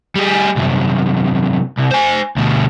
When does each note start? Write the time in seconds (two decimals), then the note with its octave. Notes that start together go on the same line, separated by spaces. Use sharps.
0.15 G3 G#4
0.56 C2 F#2
1.78 C2
1.91 C5 G#5
2.36 D2 B2